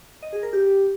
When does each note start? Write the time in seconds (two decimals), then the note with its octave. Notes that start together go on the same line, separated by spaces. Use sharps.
0.22 D#5
0.33 G#4
0.43 A#4
0.53 G4